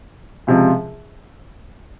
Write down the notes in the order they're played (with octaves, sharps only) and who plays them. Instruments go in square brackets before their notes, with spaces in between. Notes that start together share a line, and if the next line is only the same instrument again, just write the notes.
[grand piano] C#2 C3 F3